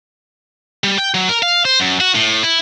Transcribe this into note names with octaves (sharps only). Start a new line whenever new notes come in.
G3
G5
F#3
A#4
F5
C5
F#2
F#4
A2
E4